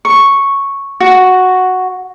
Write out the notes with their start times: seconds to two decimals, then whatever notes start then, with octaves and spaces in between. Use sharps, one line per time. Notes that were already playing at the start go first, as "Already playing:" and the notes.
0.05 C#6
1.00 F#4